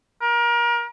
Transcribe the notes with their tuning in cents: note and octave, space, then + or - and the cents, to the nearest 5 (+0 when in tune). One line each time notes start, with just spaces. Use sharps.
A#4 +30